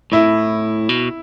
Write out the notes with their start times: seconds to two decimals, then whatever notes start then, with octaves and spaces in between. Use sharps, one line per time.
0.12 A2 E4
0.89 B2